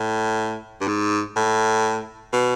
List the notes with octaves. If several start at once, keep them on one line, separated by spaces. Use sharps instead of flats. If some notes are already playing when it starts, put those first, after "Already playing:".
Already playing: A2
G2
G#2
A2
B2